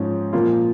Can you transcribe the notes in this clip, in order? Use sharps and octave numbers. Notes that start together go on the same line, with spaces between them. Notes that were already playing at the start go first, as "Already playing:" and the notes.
Already playing: G#2 F3 C#4
A#2 F3 A#3 F4